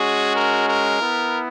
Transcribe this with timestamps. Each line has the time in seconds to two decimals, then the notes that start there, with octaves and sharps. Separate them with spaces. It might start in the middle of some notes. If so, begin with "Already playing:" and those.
Already playing: G#3 C#4 F#4 G#4
0.34 A#4
0.68 A#4
1.01 B3 E4